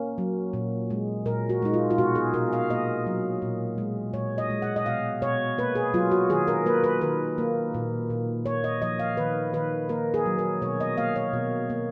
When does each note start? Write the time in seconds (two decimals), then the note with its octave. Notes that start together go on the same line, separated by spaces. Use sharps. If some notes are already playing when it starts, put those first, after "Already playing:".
Already playing: A#3 C#4
0.18 F#3
0.53 A#2
0.90 G#3
1.26 A#2 A#4
1.49 F#4
1.62 G#3 D#4
1.74 F4
1.90 F4
1.98 B2 F#4
2.15 G#4
2.34 B2 A#4
2.53 F5
2.70 A#3 D#5
3.07 F#3
3.42 A#2
3.78 G#3
4.13 A#2 C#5
4.38 D#5
4.50 G#3
4.62 F#5
4.76 D#5
4.86 B2 F5
5.22 B2 C#5
5.58 A#3 B4
5.75 G#4
5.94 F#3 F4
6.11 F#4
6.30 D#3 G#4
6.48 A#4
6.66 A#3 B4
6.84 B4
7.01 D#3 A#4
7.38 A#3
7.75 A#2
8.10 A#2
8.45 A#3 C#5
8.64 D#5
8.82 F3 D#5
8.99 F5
9.17 D#3 B4
9.53 D#3 B4
9.89 A#3 A#4
10.14 G#4
10.26 F#3
10.38 A#4
10.62 B2 C#5
10.80 D#5
10.97 A#3 F5
11.16 C#5
11.33 B2
11.70 A#3